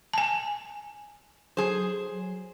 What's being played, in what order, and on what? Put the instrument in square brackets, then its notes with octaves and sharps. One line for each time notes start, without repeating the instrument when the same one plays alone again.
[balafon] G#5 A5
[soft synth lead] F#3 [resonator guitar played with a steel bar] G#4 C5